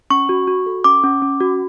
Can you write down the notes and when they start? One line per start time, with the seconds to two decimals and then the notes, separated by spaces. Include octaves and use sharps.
0.10 C#4 C#6
0.29 F#4
0.48 F#4
0.66 A4
0.84 C#4 D6
1.03 C#4
1.22 C#4
1.40 F#4